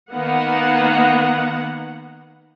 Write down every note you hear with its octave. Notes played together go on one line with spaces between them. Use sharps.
D#3 A#3 B3 F#5